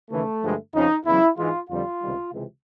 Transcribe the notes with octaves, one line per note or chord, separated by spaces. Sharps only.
D#2 C#3 E3 A3
G2 D3 F3 G#3
F2 C#3 F3 D#4
E2 C#3 F#3 E4
G#2 E3 G#3 F4
F2 D3 G3 F4
C#2 C3 D#3 G3
C#2 C3 E3 G#3